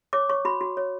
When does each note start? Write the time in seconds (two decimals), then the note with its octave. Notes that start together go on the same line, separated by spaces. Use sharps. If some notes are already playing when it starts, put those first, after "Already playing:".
0.13 C#5 D6
0.29 C#5 C#6
0.45 F#4 B5
0.61 F#4
0.77 C#5